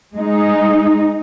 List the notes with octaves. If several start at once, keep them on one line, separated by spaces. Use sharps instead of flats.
G#3 D#4